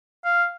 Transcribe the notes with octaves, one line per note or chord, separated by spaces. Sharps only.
F5